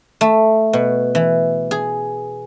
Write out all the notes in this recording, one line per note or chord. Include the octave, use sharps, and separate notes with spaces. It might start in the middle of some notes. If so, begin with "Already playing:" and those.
A3
B2
E3
G#4